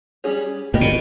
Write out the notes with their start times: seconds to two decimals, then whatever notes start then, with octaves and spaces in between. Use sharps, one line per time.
0.24 G3 C#4 G#4 C#5
0.73 A#2 G3 B3 G4 A#4 D#5
0.81 B2